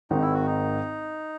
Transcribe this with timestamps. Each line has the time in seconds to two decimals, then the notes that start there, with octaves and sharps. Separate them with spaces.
0.11 G#1 G#2 D#3 D#4
0.22 E4
0.34 F#4
0.46 D#4